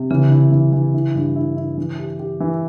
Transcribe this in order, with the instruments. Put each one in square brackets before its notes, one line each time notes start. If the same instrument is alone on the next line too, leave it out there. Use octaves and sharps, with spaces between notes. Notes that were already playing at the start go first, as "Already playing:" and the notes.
Already playing: [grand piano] C3
[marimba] C#3 [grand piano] E3
[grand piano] E4
E3
E3
E4
G2
E4
E4
E3
G4
G4
E3